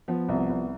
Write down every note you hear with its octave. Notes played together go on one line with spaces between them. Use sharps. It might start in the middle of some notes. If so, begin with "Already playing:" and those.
F3 B3
C2
B3
C2